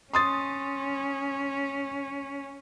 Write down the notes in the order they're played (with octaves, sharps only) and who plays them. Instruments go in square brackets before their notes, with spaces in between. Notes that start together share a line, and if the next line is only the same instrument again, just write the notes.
[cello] C#4 [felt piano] C6 D#6 A6